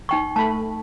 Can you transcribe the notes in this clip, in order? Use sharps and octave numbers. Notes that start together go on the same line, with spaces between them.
D#4 G5 C#6
A3 A5 B5